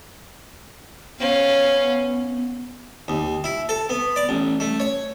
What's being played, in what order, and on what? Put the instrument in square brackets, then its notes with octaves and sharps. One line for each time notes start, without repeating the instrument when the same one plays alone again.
[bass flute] B3 [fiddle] C#4 F5
[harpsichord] D#2
E4
A4
B3
D5
A1
A3
C#5